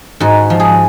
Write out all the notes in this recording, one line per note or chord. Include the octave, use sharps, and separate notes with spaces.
G#2 F#4
F3
G#4